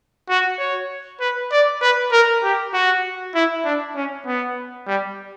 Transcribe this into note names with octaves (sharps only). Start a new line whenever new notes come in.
F#4
C#5
B4
D5
B4
A#4
G4
F#4
E4
D4
C#4
B3
G3